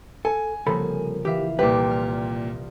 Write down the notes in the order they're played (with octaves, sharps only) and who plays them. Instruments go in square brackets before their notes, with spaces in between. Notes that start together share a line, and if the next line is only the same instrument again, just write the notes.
[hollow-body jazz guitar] A4 [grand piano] G#5
[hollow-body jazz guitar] C2 A4 B5 [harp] C#3 F3 A#3
[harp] E3 E5 F5 [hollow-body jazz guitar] G4
[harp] C2 F4 D6 [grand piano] A#2 G4 [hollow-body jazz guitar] B4
[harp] F6